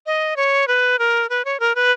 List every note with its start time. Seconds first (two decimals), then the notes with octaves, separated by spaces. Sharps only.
0.06 D#5
0.36 C#5
0.68 B4
0.99 A#4
1.29 B4
1.45 C#5
1.60 A#4
1.75 B4